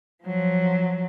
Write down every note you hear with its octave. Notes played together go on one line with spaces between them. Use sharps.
F3 F#3